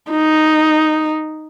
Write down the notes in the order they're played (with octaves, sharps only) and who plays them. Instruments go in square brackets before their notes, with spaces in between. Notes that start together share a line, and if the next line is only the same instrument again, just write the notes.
[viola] D#4